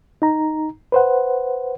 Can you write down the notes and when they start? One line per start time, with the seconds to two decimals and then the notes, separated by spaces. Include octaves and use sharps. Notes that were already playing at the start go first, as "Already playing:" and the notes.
0.22 D#4 A#5
0.92 B4 C5 F#5